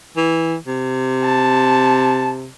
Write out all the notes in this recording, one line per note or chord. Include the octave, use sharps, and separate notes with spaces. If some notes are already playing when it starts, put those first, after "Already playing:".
E3
C3
A5